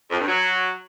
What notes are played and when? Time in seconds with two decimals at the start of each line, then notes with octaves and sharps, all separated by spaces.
0.11 F2
0.19 G2
0.27 F#3